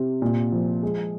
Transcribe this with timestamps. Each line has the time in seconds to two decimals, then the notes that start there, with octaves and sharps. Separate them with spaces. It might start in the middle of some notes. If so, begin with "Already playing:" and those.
Already playing: C3
0.22 A#2
0.52 F3
0.83 G#3